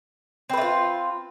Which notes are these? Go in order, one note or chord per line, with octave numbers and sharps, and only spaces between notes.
A3 C4 F4 B4